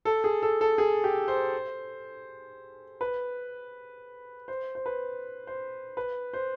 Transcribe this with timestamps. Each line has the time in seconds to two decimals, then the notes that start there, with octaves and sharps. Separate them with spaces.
0.05 A4
0.24 G#4
0.42 A4
0.61 A4
0.78 G#4
1.04 G4
1.28 C5
3.01 B4
4.48 C5
4.75 C5
4.86 B4
5.47 C5
5.97 B4
6.33 C5